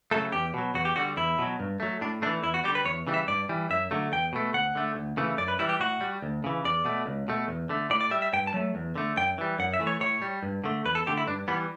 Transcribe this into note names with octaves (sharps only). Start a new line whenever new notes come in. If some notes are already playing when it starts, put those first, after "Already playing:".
C#3 F#3 A3 A4
E2 G4
B2 F#3
E2 F#4
G4
D3 G3 F#4
E2 E4
B2 F#3
G2
F#3 A3
A2 D4
E3 A3 D4
E2 E4
F#4
D3 G3 G4
B4
E2 C#5
C#3 E3 G3
E5
G2 D5
E3 G3
F#2 E5
D3 F#3 A3
E2 G5
B2 A3
D2 F#5
D3 A3
D2
C#3 E3 A3
F#2 D5
B4
E3 G3 E4
G4
A2 F#4
G3
D2
C#3 E3
E2 D5
B2 A3
C#2
B2 A3
E2
D3 A3
A2 D5
D5
G3 E5
E5
G2 G5
A5
F#3 A3
E2
D3 A3
F#2 G5
E3 G3
F#2 F#5
E5
E3 A3
C#5
A2 C#5
G3
G2
D3 A3
E2 B4
A4
D3 A3 G4
E4
G2 D4
E3 G3 B3